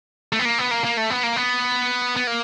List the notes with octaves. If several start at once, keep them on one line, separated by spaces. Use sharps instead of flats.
A3
B3
A#3
B3
A#3
A#3
A3
B3
A#3
B3
B3
A#3